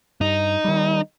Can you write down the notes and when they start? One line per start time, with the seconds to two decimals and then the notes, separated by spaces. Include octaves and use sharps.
0.21 G2 D#4
0.64 D#3 G3